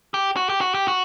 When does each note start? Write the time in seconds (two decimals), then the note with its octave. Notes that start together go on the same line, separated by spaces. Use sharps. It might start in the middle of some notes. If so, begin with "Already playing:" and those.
0.14 G4
0.37 F#4
0.49 G4
0.61 F#4
0.74 G4
0.88 F#4